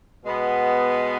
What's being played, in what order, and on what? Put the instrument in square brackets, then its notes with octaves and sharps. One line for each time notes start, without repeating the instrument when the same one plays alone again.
[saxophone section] B2 G#3 B3